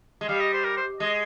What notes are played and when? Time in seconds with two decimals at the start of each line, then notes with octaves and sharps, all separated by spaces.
0.21 G#3
0.29 G3 F5
0.40 D#5
0.53 C5
0.64 A#4
0.77 C5
1.00 G#3 D#5